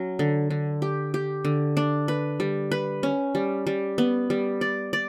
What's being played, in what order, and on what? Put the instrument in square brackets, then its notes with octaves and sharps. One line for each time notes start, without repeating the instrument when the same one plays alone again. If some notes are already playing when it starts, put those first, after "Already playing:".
Already playing: [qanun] F#3 C#4
D3
D3
G4
G4
D3
D4
B4
G3
B4
C#4
G3
G3
B3
G3
D5
D5